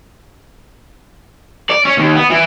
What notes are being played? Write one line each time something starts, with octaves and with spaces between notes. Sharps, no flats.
D5
C#4
D#2
B3
E3